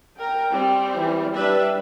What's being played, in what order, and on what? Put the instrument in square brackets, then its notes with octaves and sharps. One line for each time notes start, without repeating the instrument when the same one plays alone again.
[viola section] A#4 [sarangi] G5
[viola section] G3 C4
[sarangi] E3
[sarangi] G3 [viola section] D4 B4 E5